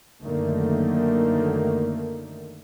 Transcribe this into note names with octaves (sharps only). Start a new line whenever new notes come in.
F#2 D3 D#3 A3 A#3